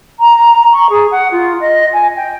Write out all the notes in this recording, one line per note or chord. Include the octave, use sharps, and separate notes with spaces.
A#5
C#6
G#4
F#5
F4
D#5
G#5
G5